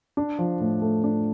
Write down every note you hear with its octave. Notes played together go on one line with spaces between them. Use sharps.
D4
F3
A2
A3
D4